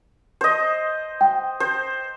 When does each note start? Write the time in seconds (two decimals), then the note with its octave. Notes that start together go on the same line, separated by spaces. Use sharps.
0.41 C5 D#5
1.21 G5
1.60 C5